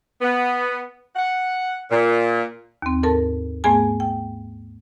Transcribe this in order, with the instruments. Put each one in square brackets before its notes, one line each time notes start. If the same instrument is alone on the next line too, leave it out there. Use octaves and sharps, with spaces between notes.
[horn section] B3
F#5
A#2
[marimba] D#2 C4
G#2 A4 A#4 A5
G#2 A3 B3 G#4 G#5
G5